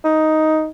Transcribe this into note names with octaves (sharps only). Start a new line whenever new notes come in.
D#4